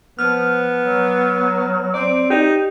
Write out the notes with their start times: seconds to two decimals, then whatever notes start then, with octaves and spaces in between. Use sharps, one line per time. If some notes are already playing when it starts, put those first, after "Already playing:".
0.19 F3 B3 F6
0.82 F#3
1.94 C4 D5
2.30 D#4 G4